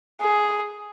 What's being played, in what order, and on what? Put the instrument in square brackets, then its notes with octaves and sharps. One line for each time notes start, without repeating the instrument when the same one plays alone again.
[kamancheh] G#4